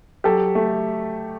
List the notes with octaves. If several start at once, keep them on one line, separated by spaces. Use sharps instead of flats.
F#3 G4 A4
A3